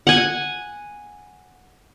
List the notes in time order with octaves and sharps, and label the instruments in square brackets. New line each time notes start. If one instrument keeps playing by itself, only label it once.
[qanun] F#5 G#5